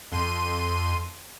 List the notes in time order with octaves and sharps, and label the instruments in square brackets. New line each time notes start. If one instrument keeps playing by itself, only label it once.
[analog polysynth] F2 C6 D#7